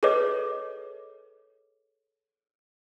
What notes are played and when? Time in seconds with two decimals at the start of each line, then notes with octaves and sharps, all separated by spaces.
0.03 G#4 A4 B4 C#5 D#5 D6